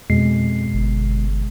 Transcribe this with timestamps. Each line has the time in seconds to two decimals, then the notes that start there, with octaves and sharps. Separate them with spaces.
0.10 F2 B2 G#3 C7
0.74 G1